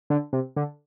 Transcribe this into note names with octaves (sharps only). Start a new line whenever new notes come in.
D3
C3
D3